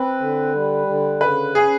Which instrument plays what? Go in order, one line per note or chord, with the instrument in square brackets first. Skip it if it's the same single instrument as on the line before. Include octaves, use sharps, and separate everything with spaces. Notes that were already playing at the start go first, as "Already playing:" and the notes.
Already playing: [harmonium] C4 [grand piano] B4
[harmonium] D3
G3
D3
[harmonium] C#3 [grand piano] B4
[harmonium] C#4 [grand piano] G#4